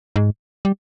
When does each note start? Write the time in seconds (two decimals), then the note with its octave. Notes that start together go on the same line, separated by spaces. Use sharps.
0.16 G#2
0.65 G3